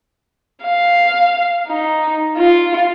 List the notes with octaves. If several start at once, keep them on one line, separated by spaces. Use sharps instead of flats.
F5
D#4
F4